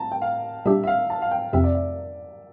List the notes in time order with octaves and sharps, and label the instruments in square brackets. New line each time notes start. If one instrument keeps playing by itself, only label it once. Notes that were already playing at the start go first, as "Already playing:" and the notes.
Already playing: [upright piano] A5 A#5
G5
F5
[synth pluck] A#2 G3 D4 G4 [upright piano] E5
[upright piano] E5
F5
A5
F5
G5
[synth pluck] F2 C3 F3 C4 [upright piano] E5
[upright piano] D5
E5